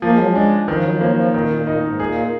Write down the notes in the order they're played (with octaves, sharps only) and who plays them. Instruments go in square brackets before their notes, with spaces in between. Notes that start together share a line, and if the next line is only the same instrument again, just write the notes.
[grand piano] F3 [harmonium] A#3
[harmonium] G#3
F#3
G#3
[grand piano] D4
[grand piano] D#3 [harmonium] F3
[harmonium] F#3
F3
[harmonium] F#3 [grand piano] A#3
[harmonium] F3
[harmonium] A#2 [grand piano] D#3
[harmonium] A#2
[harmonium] A#2 [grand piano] D#4
[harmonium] G#2
[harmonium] A#2 [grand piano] G#4